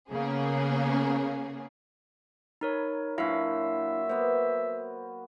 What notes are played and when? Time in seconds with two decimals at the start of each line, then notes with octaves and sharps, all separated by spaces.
0.11 C#3 A#3 B3 C#4 G#4
2.61 D#4 A#4 C#5 B5
3.18 A#2 F#3 D4 E4 E5 F5
4.09 A#3 B3 C5